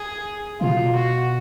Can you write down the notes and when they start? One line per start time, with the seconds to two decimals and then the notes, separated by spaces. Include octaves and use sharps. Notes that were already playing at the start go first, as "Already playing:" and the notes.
Already playing: G#4
0.60 B2 F4
0.95 F#4